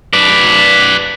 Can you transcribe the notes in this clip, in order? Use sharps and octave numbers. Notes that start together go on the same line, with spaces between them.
B4 D5